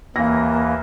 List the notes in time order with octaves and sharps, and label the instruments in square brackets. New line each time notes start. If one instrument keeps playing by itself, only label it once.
[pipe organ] D#2 E3 [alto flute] A#3 [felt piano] F5 G#5 A#6